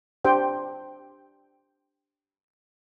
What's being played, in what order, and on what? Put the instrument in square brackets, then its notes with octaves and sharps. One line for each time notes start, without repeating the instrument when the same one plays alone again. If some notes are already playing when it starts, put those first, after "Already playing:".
[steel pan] D4 G4 C5 G5